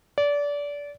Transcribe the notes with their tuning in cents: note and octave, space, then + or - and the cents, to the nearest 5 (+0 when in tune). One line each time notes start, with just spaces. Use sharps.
D5 -25